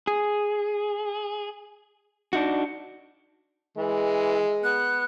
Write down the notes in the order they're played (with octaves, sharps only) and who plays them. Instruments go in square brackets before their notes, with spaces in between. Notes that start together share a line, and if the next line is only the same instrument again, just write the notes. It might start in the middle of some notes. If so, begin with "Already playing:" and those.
[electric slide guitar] G#4
D4 D#4 F#4
[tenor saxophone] E3 [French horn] G#3
[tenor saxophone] B3 [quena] F#6